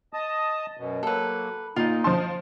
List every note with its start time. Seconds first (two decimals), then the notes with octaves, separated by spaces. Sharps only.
0.13 D#5 A5 D#6
0.77 F#2 B2
1.03 F#3 A#3 A4 B4
1.76 A#2 D#4 F4 D#5
2.04 F3 A5 C6